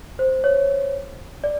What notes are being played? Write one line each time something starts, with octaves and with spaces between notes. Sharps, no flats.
C5
C#5
D5